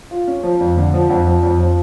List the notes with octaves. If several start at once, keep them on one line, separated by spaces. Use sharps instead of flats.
F4
C#4
F3
F2
D3
F3
F2 F#5
F3
F2
F3